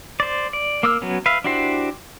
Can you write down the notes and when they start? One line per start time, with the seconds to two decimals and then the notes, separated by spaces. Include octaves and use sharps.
0.20 C5 D5
0.53 D5
0.83 A#3 D6 E6 F6
1.02 F#3 B3 C#4
1.26 B4 E5 F5
1.44 D4 E4 F#4 G4 C5